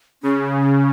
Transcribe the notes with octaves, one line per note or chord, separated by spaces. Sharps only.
C#3 C#4